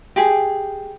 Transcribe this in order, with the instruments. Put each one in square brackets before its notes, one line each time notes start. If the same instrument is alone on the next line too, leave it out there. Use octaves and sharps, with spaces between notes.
[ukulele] G4 G#4